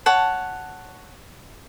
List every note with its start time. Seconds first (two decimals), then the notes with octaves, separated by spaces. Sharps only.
0.06 C#5 F#5 A5